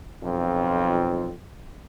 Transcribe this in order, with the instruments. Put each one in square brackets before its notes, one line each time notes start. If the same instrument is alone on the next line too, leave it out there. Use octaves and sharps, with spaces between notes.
[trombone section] B1 F2 C4 F4